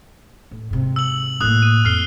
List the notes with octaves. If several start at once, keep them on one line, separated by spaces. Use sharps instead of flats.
A2
G#2 C3
E6 F#7
A2 A#3 D#6 F#6
D#7
F2 F6 C7 G7